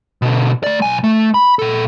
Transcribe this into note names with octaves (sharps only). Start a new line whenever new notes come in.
B2 D3
A3 D5
B1 G#5
A3
B5
A#2 A4